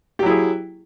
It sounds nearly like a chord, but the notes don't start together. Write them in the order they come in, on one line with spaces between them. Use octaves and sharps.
G4 F#3 E4 G#4